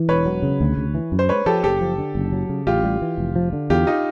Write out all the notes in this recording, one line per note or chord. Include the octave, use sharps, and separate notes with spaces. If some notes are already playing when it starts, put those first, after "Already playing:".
Already playing: E3
E1 B4 C#5
F#3
C#3
D2
D2
E3
F#2
C5
G#3 B4 C#5
F3 G4 A4
F#1 G4 A4
F3
D3
F#1
F#3
C#3
A1 F4 G4
G3
E3
F1
F3
D3
E2 F4 G4
D#4 F4